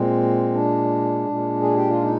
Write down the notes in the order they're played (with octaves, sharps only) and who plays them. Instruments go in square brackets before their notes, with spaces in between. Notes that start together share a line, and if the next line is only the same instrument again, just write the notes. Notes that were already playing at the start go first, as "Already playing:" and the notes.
Already playing: [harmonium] A#2 G#3 C4
D4
A#2 G#3
G#4
G4
F4
D#4